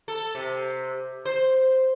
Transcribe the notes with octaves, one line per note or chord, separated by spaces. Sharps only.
A4
C3
C5